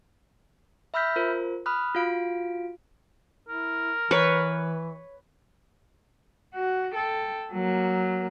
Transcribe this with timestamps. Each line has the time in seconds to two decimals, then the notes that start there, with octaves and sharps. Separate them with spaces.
0.94 E5 B5 E6 F6 G6 B6
1.16 F4 A#4 C5
1.66 B5 D#6 F6 F#6
1.95 F4 F#4 F5 D7
3.49 E4 A#4
4.11 E3 B4 C#5
6.55 F#4
6.92 A4 G5
7.53 F#3 A#3